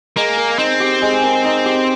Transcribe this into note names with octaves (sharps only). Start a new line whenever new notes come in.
G#3 A#3
A#4
C4 D#4
G4
G#3
A#4
D#4
G4